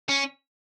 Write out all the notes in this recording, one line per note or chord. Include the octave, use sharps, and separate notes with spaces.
C#4